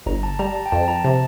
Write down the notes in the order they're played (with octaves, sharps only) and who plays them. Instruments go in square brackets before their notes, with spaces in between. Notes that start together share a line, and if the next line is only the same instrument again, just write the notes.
[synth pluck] G1 [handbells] A#5
[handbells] A5
[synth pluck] G3 [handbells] A#5
[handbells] A5
G5
[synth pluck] F2 [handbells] A5
[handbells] A5
A#5
[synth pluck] C3 [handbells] A5